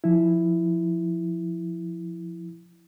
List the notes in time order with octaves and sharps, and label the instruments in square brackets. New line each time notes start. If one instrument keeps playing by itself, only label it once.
[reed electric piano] F3 E4